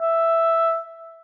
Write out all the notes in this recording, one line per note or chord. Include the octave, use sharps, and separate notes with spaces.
E5